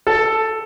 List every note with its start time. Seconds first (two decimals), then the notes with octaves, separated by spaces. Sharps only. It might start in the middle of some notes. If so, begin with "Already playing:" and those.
0.07 A4